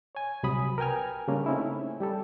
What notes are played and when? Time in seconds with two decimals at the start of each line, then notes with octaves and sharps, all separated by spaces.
0.15 C#5 G#5
0.43 C2 C3 F#3 B5 D#6
0.78 A#4 B4 G5 G#5 F6
1.28 C#3 G3 A#3 C#4 D4
1.46 A3 C4 C#4 D#4 E4
2.00 G3 G4 A4